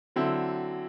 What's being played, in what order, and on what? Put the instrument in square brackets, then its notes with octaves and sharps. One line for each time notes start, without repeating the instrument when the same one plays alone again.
[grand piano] D3 F#3 C4 E4